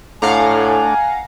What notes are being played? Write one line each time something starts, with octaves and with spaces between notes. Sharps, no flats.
A2 A3 D4 F5 F#5 G#5 A#5